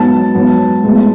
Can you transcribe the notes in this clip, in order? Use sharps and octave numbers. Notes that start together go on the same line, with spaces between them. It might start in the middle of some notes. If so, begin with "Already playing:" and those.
Already playing: G#2 F#3 B3 A5
G#2 F#3 B3
A2 G#3 B3